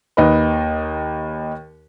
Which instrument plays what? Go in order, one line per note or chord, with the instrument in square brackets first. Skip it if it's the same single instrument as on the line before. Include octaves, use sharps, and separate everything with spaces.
[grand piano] D#2 D#4 B4